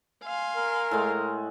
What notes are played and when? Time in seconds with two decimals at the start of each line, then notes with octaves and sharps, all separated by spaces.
0.23 F5 G#5 C6
0.56 A#4
0.91 A2 G#3